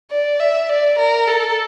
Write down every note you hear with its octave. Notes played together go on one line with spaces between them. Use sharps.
D5
E5
D5
A#4
A4